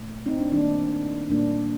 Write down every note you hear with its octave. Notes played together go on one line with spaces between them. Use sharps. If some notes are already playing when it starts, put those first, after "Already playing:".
Already playing: A#2 A3
C4 D#4
D4
D#3 G3 A#3 D4
A#2 G3 A#3 D4